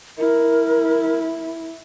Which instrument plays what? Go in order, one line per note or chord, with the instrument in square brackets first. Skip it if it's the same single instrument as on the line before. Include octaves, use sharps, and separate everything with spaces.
[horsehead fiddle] E4 [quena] A#4